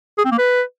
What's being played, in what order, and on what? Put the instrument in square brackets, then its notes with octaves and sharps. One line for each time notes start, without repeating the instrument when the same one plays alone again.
[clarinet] G#4
C4
A#3
B4